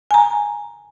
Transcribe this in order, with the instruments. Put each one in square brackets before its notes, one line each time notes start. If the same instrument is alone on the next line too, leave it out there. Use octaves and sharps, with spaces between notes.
[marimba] G#5 A#5